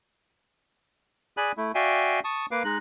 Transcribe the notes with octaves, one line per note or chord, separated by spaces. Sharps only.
G#4 D5 G#5 B5 F#6
A3 E4
F#4 D5 E5 F5 G5 G#5
A5 C#6 D#6
A#3 B4 F5 D6
G#3 D#4 F#6